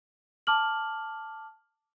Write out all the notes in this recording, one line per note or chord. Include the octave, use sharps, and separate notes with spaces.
A5 D6 F6 F#7